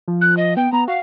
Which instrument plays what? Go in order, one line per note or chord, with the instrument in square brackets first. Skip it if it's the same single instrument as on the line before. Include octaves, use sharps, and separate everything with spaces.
[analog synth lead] F3
[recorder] F#6
D#5
[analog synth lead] B3 [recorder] G5
[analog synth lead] B3 [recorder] A#5
[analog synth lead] F#4 [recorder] F5